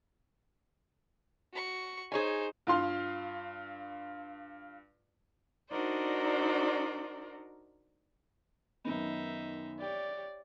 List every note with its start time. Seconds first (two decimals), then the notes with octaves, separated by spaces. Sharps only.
1.53 F#4 C#6
2.12 D#4 G#4 C5 C#5 G#5
2.67 G2 F4 C6 F6
5.70 D4 D#4 F#4 A#4 C5 D5
8.85 F#2 D#3 B3 D#4 E5
9.80 G4 C#5 D5